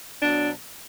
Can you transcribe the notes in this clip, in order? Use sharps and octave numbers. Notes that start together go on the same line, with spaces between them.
B2 F#3 D4